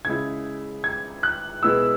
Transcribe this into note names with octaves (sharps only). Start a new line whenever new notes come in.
C#3 G#3 E4 G#6
G#6
F#6
B2 G#3 B3 E4 E6